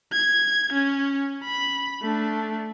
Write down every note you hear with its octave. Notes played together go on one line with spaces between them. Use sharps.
G#6
C#4
B5
A3 D4